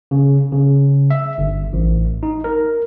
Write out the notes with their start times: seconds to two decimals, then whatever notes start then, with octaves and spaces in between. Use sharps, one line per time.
0.11 C#3
0.53 C#3
1.11 E5
1.38 G1
1.73 A1
2.23 D#4
2.44 A#4